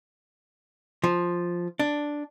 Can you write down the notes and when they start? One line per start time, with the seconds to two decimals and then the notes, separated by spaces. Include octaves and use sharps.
1.04 F3
1.79 D4